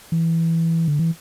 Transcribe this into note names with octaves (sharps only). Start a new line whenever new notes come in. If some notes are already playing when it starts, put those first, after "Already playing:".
E3
D3
E3